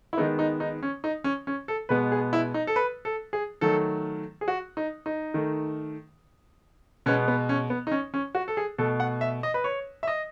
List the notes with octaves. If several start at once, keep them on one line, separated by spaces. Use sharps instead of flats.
E4
D#3 G#3 B3 D#4
D#4
D#4
C#4
D#4
C#4
C#4
A4
B2 G#3 B3 B4
G#4
E4
D#4
A4
B4
A4
G#4
D#3 F#3 A3 A4
G#4
F#4
D#4
D#4
D#3 A3
B2 G#3 B3 C#4
B3
C#4
B3
D#4
C#4
C#4
F#4
A4
G#4
B2 A3 A4
F#5
E5
D#5
B4
C#5
E5
D#5